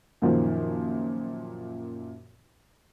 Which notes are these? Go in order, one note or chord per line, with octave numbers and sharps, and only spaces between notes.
F#2 A#2 D#3 F3